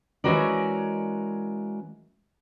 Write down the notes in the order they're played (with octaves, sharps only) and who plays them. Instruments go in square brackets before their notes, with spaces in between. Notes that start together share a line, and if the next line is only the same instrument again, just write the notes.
[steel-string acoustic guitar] E3 G#3 C#4 F#4 A#4 D5